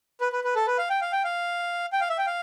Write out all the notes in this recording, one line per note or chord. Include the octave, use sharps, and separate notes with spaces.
B4
B4
B4
A4
B4
F5
G5
F5
G5
F5
G5
F5
E5
G5
F5